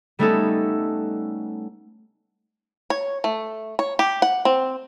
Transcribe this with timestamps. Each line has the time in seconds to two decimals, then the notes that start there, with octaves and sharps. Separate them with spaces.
0.19 G3 A3 B3 C#4 D#4 A4
2.90 C#5
3.24 A3
3.79 C#5
3.99 G4
4.22 F#5
4.45 C4